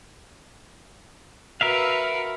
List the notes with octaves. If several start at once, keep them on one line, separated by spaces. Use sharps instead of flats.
F#4 A#4 B4 E5 F5